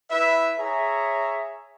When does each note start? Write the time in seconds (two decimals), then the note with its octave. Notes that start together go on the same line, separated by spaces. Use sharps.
0.10 E4 B4 E5
0.58 G#4 C#5 E5 A#5